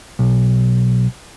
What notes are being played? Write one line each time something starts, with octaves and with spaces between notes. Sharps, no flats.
B1